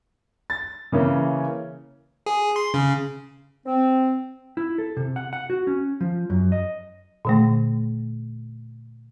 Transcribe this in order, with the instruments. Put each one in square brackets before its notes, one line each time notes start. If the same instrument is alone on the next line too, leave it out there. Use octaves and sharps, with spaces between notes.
[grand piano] A6
C#3 E3 A#3 C#4
[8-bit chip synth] G#4
C6
C#3
[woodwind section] C4
[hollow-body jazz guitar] E4
A4
C3
F#5
F#5
F#4
C#4
F3
F#2
D#5
[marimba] A#2 D3 A3